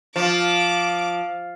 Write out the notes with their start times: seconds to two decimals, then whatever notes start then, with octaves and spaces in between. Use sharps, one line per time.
0.16 F3 D6